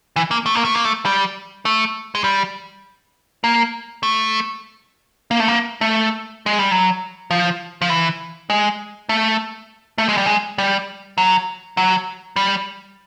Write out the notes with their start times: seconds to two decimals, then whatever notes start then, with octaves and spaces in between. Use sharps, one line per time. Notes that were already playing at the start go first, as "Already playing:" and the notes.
0.16 E3
0.31 A#3
0.46 A3
0.55 A#3
0.65 A3
0.75 A#3
0.85 A3
1.05 G3
1.65 A3
2.15 G#3
2.24 G3
3.44 A#3
4.03 A3
5.31 A#3
5.40 A3
5.48 A#3
5.81 A3
6.46 G#3
6.59 G3
6.71 F#3
7.31 F3
7.82 F3
7.90 E3
8.50 G#3
9.09 A3
9.98 A3
10.09 G#3
10.18 G3
10.26 G#3
10.58 G3
11.18 F#3
11.77 F#3
12.36 G3